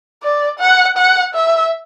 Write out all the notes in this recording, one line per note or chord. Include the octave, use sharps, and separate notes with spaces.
D5
F#5
F#5
E5